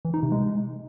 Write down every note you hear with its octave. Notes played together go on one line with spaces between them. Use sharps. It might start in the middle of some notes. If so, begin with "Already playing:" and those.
E3
D#4
C3
G#3